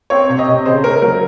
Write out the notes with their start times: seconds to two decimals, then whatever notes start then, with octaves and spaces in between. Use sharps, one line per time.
0.10 C4 C#5
0.29 C3
0.39 D#5
0.47 C3
0.66 C#3 C5
0.84 C#4 A#4
1.02 F#3 A#4